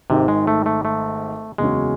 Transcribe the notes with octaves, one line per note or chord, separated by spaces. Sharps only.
G#1 G#2 C3 D#3
G#3
A3
A3
A3
F#1 E2 C#3 F#3 G#3 C#4